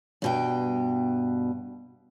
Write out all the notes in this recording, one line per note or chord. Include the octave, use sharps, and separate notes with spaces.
G2 B2 G5